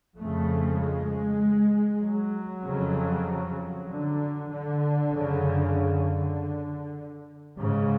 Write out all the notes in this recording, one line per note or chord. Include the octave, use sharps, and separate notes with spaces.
F2 C#3 A3
G#3
F#3
F2 C#3
D3
D3
F#2 C#3
D3
G#2 C#3